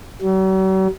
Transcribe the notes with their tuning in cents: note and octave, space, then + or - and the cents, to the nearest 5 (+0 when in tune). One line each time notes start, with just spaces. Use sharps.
F#3 +45